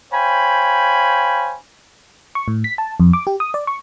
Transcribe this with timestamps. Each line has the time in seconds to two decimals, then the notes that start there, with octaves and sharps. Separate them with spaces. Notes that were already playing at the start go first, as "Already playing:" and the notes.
0.13 C5 C#5 F5 G5 G#5 B5
2.35 C#6
2.48 A2
2.64 B6
2.78 A5
3.00 F2
3.13 D6
3.27 G4
3.40 D#6
3.54 D5
3.67 C#6